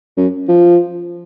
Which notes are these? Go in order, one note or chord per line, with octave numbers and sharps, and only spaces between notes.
F#2
F3